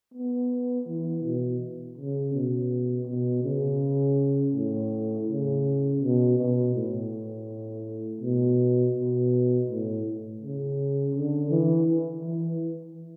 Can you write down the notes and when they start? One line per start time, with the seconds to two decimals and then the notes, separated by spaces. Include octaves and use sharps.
0.14 B3
0.88 E3
1.23 B2
1.98 C#3
2.34 B2
3.07 B2
3.43 C#3
4.54 A2
5.27 C#3
6.01 B2
6.37 B2
6.74 A2
8.21 B2
8.94 B2
9.67 A2
10.41 C#3
11.15 D3
11.50 E3
12.24 E3